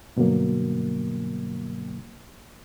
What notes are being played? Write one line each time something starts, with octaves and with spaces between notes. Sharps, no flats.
G2 B2 D3 F#3 A#3